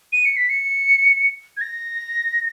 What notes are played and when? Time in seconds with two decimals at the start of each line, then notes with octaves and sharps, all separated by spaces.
0.12 D#7
0.25 C#7
0.37 B6
0.49 C#7
1.57 G#6
1.61 A#6